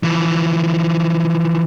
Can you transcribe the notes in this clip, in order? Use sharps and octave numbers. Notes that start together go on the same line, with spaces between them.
E3 F3